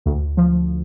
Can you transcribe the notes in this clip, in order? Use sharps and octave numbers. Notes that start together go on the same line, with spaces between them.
D2
F3